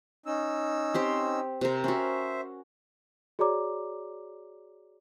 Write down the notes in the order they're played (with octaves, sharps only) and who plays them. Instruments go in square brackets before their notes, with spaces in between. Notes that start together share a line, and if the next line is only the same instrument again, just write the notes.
[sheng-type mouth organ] C#4 D#4 E6
[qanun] C4 G4 C6
[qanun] C3 A#4 [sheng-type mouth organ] C5
[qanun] C#4 F#4 [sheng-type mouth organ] C5 E5
[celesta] F#4 G#4 C#5 D5 A#5 D6